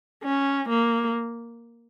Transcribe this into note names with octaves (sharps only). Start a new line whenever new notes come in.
C#4
A#3